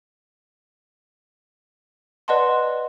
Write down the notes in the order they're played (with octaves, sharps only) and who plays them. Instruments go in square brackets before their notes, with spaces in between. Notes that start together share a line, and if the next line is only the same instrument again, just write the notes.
[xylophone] B4 D5 D#5 F#5 A5 C6